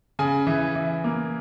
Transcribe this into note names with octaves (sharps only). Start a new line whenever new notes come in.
C#3 G#5
E3
E3
A#3